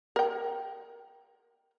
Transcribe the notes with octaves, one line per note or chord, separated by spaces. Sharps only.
A#4 G5